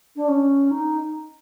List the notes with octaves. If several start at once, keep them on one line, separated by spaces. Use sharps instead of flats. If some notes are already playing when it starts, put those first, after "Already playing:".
D4
C#4
D#4